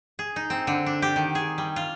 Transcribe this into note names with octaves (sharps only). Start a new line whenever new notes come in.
G#4
D#4
C4
D3
D4
G4
D#3
G#4
G3
F4